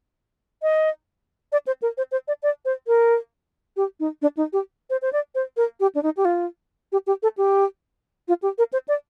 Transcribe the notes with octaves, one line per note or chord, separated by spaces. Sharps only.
D#5
D5
C5
A#4
C5
C5
D5
D5
C5
A#4
G4
D#4
D4
D#4
G4
C5
C5
D5
C5
A#4
G4
D4
D#4
G4
F4
G4
G4
A4
G4
F4
G4
A#4
C5
D5